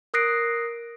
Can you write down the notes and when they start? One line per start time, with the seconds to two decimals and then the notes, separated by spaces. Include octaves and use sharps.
0.14 A#4 D#6 F#6 A#6 C7 D7